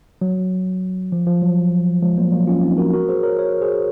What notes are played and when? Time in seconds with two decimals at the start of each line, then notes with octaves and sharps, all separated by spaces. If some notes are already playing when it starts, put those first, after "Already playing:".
0.21 F#3
1.12 F3
1.27 F3
1.42 F#3
2.02 F3 G#3
2.18 F#3 A#3
2.32 F#3 A#3
2.47 C#4 F4
2.63 C4 D#4
2.78 F#4 A#4
2.93 F#4 A#4
3.09 G#4 C5
3.23 A#4 C#5
3.39 A#4 C#5
3.62 G#4 C5